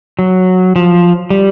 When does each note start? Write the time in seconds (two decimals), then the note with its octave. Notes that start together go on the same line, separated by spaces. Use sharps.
0.19 F#3
0.76 F3
1.30 G3